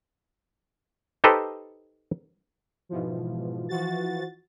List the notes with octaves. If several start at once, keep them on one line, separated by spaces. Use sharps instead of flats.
D#4 G4 A4 B4 C5 D#5
G#2 B2 E3 F3
E3 F3 F#4 A6